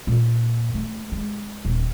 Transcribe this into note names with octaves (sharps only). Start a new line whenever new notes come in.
A#2
A3
G#3
D#1